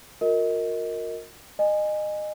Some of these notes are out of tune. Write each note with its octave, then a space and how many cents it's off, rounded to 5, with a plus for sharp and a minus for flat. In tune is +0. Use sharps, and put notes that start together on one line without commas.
F#4 -45 A#4 -10 D#5 +20
D#5 -25 G#5 -5